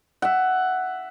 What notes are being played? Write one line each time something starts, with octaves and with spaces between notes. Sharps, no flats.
E5 F#5